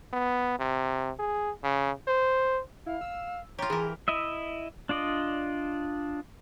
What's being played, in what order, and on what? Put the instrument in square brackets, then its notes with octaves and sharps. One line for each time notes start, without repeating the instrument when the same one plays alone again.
[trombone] B3
C3
G#4
C#3
C5
[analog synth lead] E4 [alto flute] F5
[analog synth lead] E6
[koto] F4 G4 [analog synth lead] C#5 [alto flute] A#5
[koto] E3 A#4 [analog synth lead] G#4
[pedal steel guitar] E4 D#5 E5
D4 F4 D5 D#5